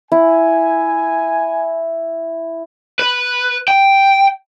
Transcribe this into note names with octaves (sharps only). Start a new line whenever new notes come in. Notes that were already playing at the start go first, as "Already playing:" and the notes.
E4 G#5
B4
G5